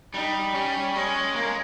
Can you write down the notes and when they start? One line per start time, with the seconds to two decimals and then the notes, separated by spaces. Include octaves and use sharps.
0.14 G3 D#4
0.54 G3 C#4
0.95 G#3 C#4
1.36 A#3
1.46 G#3